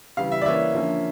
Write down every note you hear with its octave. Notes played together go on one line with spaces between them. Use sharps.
C#3 E3 G3 F5
E5
D5
E3 A#3 C#4 E5
D3 F3 A#3 C#4